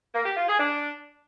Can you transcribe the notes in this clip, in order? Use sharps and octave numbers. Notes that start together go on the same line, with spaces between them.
A#3
G4
F4
G#4
D4